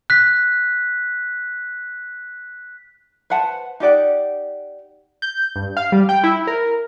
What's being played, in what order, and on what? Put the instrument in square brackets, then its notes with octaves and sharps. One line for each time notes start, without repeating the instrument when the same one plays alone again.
[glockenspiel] F#6 B6
[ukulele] B4 C5 F#5 A5
D#4 G4 D5 F#5
[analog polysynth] G6
G2
F5
G3
G5
E4
A#4